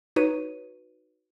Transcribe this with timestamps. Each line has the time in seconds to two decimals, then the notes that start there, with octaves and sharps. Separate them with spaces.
0.16 D#4 F#4 B4 C#5 D#7